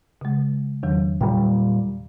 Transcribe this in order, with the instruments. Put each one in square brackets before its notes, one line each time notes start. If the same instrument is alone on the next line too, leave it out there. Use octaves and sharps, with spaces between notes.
[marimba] C#3 G#3
E2 D#3 F#3
[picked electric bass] A#2 G3 [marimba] G5